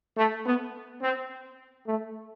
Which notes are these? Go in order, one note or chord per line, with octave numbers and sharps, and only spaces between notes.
A3
B3
C4
A3